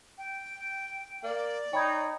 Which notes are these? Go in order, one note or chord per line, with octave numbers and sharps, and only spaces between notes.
G5
A#3 D5
D#4 C#5 G5 B5 G#6